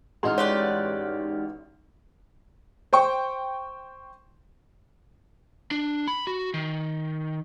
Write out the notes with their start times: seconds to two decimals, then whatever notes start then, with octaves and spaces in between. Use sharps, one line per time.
0.23 A1 G#3 D#4 F#4 C6 F6
0.38 G4 B4 C#5 D5
2.93 C5 G5 C#6
5.71 D4
6.08 B5
6.27 F#4
6.54 D#3